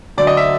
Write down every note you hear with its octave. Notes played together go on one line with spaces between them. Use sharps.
D2 D3 F#3 D5
D#5
E5